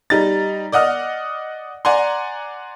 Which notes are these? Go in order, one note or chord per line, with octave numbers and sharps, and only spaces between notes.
G3 D#4 A6
D5 D#5 F#5 D#6 F6
D5 F#5 G#5 A#5 C6